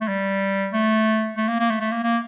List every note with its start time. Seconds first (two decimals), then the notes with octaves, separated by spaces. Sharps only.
0.01 A3
0.08 G3
0.73 A3
1.37 A3
1.49 A#3
1.60 A#3
1.70 A3
1.81 A3
1.92 A#3
2.03 A#3